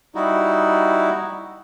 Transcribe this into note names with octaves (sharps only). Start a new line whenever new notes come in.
G3 D#4 E4 F#4